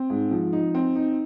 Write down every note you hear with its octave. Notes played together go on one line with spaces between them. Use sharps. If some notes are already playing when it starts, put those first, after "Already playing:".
Already playing: C4
G#2
F3
D#4
C4
D#4